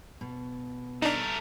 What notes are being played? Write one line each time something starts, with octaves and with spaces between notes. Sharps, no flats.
B2
A3 D4 D#4 A#4